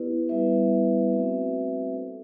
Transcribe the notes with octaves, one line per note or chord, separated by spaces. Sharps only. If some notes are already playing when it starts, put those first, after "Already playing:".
Already playing: B3 E4 G4 B4 D5
G3 B3 E4 B4 E5
A3 C4 F#4 B4 E5
D4 A4 C5